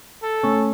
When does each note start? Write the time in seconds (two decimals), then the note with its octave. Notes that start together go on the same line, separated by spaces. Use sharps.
0.23 A4
0.43 A3 C#4